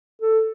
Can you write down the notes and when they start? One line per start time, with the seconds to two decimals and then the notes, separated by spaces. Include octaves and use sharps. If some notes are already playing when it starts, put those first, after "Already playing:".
0.22 A4